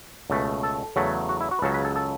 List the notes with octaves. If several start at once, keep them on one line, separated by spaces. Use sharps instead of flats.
C#2 B2 A3
A4
E2 C#3 F#3 A3
F#4
E4
F#4
B4
C#2 C#3 F#3 A4
B4
A4
A4